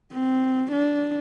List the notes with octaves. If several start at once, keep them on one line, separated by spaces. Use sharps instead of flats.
C4
D4